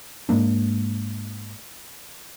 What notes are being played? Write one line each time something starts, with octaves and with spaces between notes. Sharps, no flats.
G#2 G#3 A#3 D4